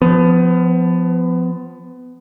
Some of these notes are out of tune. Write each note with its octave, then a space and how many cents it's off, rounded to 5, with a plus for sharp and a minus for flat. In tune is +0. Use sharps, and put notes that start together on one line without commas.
F3 +0 B3 +25